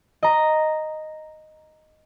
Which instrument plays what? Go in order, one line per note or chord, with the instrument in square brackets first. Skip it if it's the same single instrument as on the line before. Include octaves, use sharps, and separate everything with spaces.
[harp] D#5 A#5